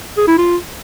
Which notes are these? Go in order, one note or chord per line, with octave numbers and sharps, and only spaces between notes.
G#4
E4
F4